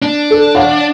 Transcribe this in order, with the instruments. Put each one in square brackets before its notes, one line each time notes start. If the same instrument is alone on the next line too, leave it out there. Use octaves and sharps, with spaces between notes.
[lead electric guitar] D4
[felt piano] A4
C#5 F5 F#5